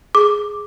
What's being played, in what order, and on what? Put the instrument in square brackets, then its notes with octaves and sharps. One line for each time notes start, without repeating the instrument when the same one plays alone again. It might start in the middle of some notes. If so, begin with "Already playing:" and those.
[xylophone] G#4 D6